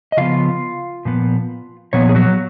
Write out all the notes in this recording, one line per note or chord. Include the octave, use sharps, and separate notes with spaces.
D#5
C#3 F3 B3 F4 F5
A#2 F3 B3
A#2 F3 B3 C#5
G#4
F#3 F#4